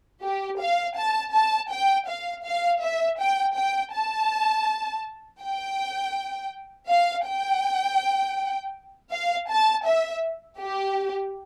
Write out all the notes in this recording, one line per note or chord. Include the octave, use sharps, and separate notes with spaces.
G4
F5
A5
A5
G5
F5
F5
E5
G5
G5
A5
G5
F5
G5
F5
A5
E5
G4